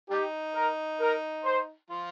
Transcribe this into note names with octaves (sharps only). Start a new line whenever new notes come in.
G3 D#4 G4
A#4
A#4
C5
F3 F4